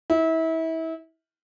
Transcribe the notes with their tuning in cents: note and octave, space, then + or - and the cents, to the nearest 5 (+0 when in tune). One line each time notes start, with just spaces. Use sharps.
E4 -30